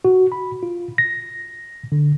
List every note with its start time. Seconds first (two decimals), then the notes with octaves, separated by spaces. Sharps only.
0.05 F#4
0.32 B5
0.63 F4
0.98 A#6
1.92 D3